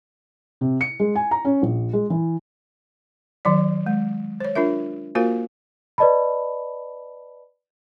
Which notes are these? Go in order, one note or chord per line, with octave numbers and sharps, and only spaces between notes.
C3
C#7
G#3
G#5
A#5
C#4
A#1
G#3
E3
D#3 F#3 D5
G#3
C5 C#5
D4 F4 A#4 E5
A#3 F4 F#4 A#4 C5 F5
B4 D5 D#5 A5 B5